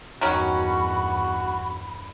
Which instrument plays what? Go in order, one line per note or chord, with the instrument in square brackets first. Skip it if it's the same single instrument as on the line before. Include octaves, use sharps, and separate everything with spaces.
[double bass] E2 G2 [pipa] D#3 F#3 C#4 [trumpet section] F#4 [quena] B5